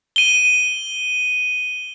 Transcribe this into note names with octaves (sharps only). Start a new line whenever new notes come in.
D#7 G7